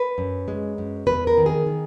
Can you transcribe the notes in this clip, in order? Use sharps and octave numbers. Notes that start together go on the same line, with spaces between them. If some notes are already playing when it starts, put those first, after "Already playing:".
Already playing: B4
F#2
G#3
F#2
E2 B4
A#4
D#3
G#4
D#3